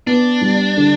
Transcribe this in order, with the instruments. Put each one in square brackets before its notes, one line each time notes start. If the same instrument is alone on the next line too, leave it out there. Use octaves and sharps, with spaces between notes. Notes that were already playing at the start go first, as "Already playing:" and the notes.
[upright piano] B3 [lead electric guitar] D4
[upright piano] G3
D3